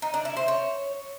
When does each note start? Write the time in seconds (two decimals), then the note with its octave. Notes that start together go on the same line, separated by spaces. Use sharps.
0.02 D#4
0.14 D4
0.25 E4
0.37 C5
0.48 C#5